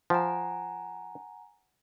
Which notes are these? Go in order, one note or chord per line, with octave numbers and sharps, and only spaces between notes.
F3 F#5 G#5 A#5